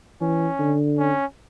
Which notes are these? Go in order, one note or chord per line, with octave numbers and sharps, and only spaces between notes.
E3 C#4
D3
C#4